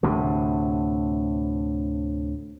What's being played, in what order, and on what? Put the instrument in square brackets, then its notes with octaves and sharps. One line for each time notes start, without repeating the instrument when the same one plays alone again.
[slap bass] D2 A2 C3